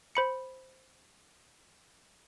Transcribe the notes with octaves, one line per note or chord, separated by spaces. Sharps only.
C5 B5 C#7